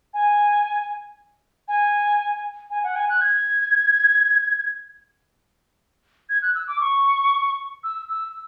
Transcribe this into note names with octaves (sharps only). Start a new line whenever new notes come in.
G#5
G#5
G#5
F#5
G#5
F#6
G#6
G#6
F#6
E6
D6
C#6
E6
E6